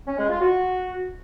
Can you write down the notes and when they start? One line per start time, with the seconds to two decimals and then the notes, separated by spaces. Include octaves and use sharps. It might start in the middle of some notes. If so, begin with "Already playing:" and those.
0.07 C#4
0.18 G#3
0.29 F4
0.40 F#4